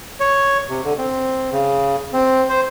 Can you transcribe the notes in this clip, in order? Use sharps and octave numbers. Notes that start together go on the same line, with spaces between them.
C#5
C3
D3
C4
C#3
C4
C5